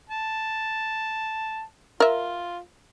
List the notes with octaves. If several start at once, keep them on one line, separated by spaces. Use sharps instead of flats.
A5
F4 A#4 E5